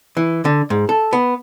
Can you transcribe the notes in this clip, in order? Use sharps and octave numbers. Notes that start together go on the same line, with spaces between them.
E3
D3
G#2
A4
B3